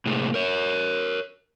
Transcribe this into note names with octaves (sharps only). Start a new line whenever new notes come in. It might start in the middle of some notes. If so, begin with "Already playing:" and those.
A2 C3 G#3 A#3
A#4 C#5